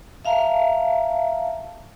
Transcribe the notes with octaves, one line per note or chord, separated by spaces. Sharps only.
E5 F5 A5 A#5